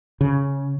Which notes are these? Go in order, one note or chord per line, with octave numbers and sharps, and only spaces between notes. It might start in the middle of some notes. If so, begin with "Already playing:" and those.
C#3